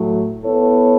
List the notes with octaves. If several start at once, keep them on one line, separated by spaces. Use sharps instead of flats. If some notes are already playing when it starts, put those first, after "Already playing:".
Already playing: A2 F#3 A3
B3 E4 A4 C#5